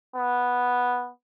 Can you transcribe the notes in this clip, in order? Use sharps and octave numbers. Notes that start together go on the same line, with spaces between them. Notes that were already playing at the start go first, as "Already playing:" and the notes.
B3